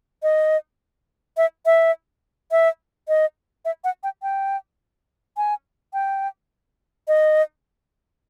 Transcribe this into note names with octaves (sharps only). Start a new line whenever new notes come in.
D#5
E5
E5
E5
D#5
E5
F#5
G5
G5
G#5
G5
D#5